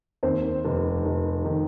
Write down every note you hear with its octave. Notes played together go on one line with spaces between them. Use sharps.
D#2 C4 C5
F1
F1
D#3